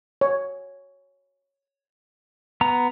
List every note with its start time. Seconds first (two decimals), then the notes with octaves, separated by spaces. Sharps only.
0.21 C#5
2.61 B3 A#5